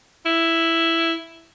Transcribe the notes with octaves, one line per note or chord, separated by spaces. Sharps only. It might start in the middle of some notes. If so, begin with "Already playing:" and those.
E4